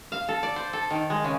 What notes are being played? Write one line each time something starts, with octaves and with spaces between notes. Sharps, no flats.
F5
A4
D5
C5
A4
D#3
G#3
C#3